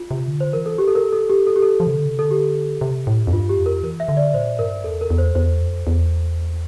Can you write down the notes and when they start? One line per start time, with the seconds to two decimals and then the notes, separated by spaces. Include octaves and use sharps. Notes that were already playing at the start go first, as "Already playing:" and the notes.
Already playing: F4
0.11 C3
0.27 D3
0.41 C5
0.53 E3 A#4
0.66 A4
0.78 G4
0.88 A4
0.95 A#4
1.12 A4
1.29 G4
1.47 A4
1.56 G4
1.62 A4
1.80 F3
1.87 C3
1.93 D3
2.06 C3
2.18 D3 A4
2.31 G4
2.81 C3
3.07 A2
3.27 F2
3.32 G2 F4
3.50 G4
3.57 F2
3.66 A#4
3.83 E3 A#4
4.00 E5
4.09 D3
4.17 D5
4.34 A#2 C5
4.59 G2 A#4
4.84 E2 A4
5.01 A#4
5.10 E2
5.18 C5
5.35 E2 C5
5.61 F2
5.87 E2